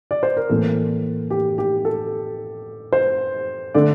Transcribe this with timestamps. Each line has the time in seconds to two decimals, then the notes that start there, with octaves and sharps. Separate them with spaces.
0.11 D5
0.23 C5
0.37 A#4
0.49 A2 E3 A#3 A4
1.31 G4
1.58 G4
1.85 A4
2.93 C5
3.74 D3 A3 D5